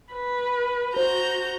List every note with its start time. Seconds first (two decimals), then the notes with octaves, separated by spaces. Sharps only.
0.13 B4
0.96 F#4 C5 A#5 G6